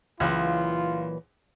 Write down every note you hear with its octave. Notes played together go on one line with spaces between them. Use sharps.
C#2 A#2 E3 F#3 F4